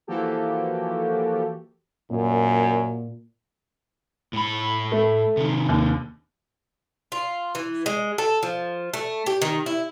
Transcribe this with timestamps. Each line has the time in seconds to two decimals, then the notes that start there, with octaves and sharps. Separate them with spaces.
0.07 E3 F3 A#3 F#4 G4 A4
2.11 F#2 A#2
4.33 A2 B5
4.92 A3
5.37 C3 D#3
5.69 D#2
7.12 F4
7.55 E3
7.86 G#3
8.18 A4
8.43 F3
8.93 A3
9.26 G4
9.42 D#3
9.66 E4